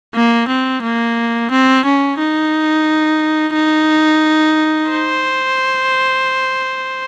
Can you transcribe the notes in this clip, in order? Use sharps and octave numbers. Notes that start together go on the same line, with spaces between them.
A#3
C4
A#3
C4
C#4
D#4
D#4
C5